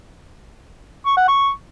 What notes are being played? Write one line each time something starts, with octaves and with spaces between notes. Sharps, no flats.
C#6
F#5
C#6